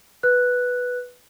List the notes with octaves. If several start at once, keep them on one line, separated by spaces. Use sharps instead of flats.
B4 F#6